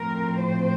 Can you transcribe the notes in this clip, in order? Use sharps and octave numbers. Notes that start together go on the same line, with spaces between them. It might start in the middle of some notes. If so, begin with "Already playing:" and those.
Already playing: A2 F3 C4 A#4
C5